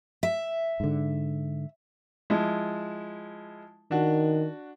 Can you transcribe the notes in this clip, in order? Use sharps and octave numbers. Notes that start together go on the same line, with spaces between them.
E5
G#2 D3
F3 G#3 E4
D#3 D4 F#4